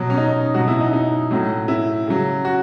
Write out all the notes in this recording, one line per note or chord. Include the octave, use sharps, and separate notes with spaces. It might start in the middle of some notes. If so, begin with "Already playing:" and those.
Already playing: B2 F#3
C#4
D#4
B2 F#3 F#4
E4
D#4
D#4
A2 F#3
E4
C#3 F#3
F#4